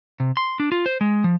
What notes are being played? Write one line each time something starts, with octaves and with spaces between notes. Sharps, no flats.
C3
C6
D4
F4
C5
G#3
F3